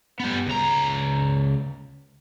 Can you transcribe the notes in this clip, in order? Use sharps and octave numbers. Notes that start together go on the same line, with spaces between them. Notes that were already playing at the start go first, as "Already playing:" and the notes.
G3 B3
C#2 A#5